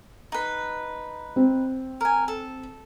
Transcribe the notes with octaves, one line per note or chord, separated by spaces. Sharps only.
D#4 B4
C4
A#4 G#5
A4